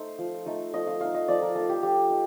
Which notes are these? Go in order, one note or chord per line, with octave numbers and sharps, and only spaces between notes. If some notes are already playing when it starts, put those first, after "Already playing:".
Already playing: A3 D#4 C5
F3
A3 D#4
F3 D#5
F5
A3 D#4 F5
D#5
F3 D5
A#4
A3 D#4 A4
G4
F3 G4
D#4